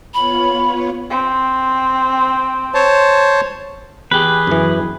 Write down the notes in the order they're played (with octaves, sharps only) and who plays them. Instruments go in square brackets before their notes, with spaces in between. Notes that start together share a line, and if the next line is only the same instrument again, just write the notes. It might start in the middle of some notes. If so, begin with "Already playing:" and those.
[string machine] B3 F4 C#5 [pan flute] B5
[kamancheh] C4
[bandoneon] C5 C#5 A5
[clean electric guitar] E2 G4 [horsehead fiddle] G#4 [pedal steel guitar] B4
[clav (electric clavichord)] F#2 E3